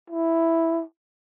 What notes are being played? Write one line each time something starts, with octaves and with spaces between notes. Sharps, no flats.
E4